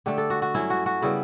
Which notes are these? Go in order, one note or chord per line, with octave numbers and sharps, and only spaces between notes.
D3 A3 D4 G4
A4
F#4
F#4
G2 F#3 C#4 E4
F#4
F#4
C#3 G3 B3 E4